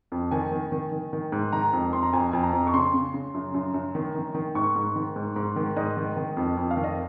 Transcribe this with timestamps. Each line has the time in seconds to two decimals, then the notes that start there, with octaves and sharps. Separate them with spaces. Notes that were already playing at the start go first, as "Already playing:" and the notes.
0.12 F2
0.31 D#3 G#5
0.51 D#3
0.72 D#3
0.92 D#3
1.13 D#3
1.32 G#2
1.53 D#3 A#5
1.73 F2
1.93 F2 C6
2.03 A#5
2.13 F2 G#5
2.32 F2 G#5
2.43 A#5
2.53 F2
2.67 C#6
2.74 C#3 C6
2.94 C#3
3.14 C#3
3.34 F#2
3.54 F#2
3.74 F#2
3.95 D#3
4.15 D#3
4.34 D#3
4.55 G#2 C#6
4.76 G#2
4.96 D#3
5.16 G#2
5.36 G#2
5.56 D#3
5.77 G#2 D#5
5.97 D#3
6.17 D#3
6.37 F2
6.57 F2
6.71 F5
6.77 D#3
6.84 D#5